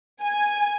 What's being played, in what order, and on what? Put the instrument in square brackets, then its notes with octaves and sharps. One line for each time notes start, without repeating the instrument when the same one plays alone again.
[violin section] G#5